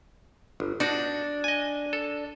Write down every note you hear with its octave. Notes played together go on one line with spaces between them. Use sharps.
G1
D4 D#4 F#4
D#5 G#5
A4